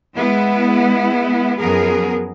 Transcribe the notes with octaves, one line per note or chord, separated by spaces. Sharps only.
G#3 B3 E4
F#2 F3 B3 G#4 A#4